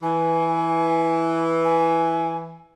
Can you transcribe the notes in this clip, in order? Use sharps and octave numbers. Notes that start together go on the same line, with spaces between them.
E3 G#5
G#5